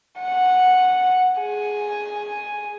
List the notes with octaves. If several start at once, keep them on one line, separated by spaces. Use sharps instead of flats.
F#5
G#4